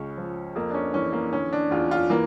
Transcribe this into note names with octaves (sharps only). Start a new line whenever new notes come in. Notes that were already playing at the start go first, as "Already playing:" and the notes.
Already playing: C#2 C#4
F3
F2 A#3
D4
C#4
E3 C#4
A#3
D3 C#4
D4
E2 F4
F4
E3 A#3